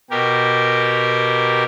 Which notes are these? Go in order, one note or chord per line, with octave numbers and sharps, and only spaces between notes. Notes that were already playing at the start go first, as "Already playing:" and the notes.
B2 G4 A#4